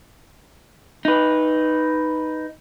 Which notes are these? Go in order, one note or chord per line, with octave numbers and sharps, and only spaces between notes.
D#4 B4